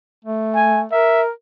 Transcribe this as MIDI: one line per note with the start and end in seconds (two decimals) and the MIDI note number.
0.24 0.84 57
0.55 0.81 80
0.92 1.30 70
0.92 1.22 76